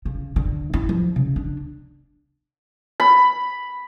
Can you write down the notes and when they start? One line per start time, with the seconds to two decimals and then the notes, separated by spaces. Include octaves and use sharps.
0.05 C#3
0.36 D3
0.74 E4
0.89 F3
1.16 C#3
1.36 D4
3.00 B5